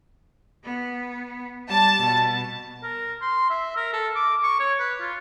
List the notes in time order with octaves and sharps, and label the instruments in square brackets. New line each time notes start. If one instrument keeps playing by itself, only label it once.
[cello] B3
[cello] G3 [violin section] A5
[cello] B2
[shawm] A#4
C6
E5
A#4
A4
D6
C#6
C#5
B4
F4